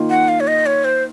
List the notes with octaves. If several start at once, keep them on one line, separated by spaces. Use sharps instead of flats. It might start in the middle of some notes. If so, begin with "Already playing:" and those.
Already playing: D#3 A#3 F4
F#5
F5
C#5
D#5
C#5
C5